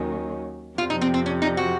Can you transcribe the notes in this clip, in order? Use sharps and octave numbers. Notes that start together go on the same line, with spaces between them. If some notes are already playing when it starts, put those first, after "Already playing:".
Already playing: D#2 D#3 F#3 C#4
F2 C3 F3 F4
D#4
C4
C4
C#4
D#4
F#4